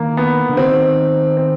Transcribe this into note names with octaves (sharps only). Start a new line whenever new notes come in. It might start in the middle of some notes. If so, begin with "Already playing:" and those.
Already playing: D#3 A#3
B3
D3
D#3 C4
C4